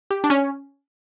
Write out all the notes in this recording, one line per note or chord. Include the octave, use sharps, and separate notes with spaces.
G4
D4
C#4